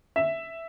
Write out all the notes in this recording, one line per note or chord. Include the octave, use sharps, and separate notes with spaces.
E5